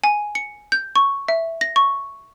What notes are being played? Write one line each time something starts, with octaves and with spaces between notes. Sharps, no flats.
G#5
C#7
G6
C#6
E5
A#6
C#6